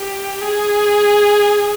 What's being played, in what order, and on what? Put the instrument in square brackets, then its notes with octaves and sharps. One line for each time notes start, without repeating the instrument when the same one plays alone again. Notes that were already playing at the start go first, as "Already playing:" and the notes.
Already playing: [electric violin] G4
G#4